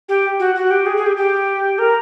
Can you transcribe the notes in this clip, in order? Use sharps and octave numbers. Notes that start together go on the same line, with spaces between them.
G4
F#4
F#4
G4
G#4
G#4
G4
G4
A#4